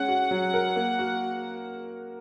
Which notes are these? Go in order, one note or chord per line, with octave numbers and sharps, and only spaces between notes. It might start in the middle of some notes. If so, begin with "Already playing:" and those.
Already playing: G#3 C#4 F#5
F#4
F#3
A#4
A#3
F#4